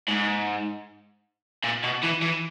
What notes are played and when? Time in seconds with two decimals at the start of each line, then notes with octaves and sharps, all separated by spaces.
0.08 G#2
1.64 A#2
1.84 B2
2.04 E3
2.23 E3